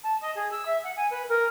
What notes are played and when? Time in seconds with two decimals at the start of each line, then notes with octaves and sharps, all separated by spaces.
0.03 A5
0.21 D#5
0.35 G#4
0.51 E6
0.65 E5
0.83 F#5
0.96 G#5
1.10 B4
1.28 A#4